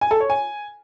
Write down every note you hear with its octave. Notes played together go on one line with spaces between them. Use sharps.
G#5
A4
C#5
G#5